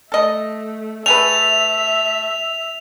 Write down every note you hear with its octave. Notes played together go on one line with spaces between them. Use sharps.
A3 A4 D#5
A3 G#4 B4 E5 F7